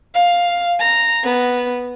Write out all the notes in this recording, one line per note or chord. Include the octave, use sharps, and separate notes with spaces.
F5
A#5
B3